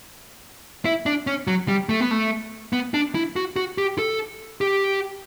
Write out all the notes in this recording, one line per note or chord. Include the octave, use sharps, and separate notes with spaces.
E4
D4
C#4
F#3
G3
A3
B3
A3
B3
D4
E4
F#4
F#4
G4
A4
G4